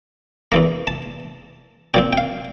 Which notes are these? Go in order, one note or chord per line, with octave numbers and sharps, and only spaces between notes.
E2 E3 A#3 A#5
A5
A#2 F3 C4 G5
G5
F5